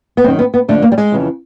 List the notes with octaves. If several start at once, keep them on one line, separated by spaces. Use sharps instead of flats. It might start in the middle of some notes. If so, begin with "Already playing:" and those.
B3
F#2 D#3 C4
B3
B3
F2 D3 A3
A#3
G3
G#3
F2 C#3 E3